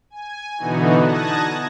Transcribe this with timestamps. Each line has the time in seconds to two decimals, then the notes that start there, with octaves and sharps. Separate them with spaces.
0.10 G#5
0.58 B2 D3 E3 B3 D#4 F#4
1.00 A5 D#6 F#6 G#6 A#6